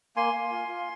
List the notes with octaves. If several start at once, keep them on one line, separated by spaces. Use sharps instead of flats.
A#3 G#5 C6
A#3
F4
F4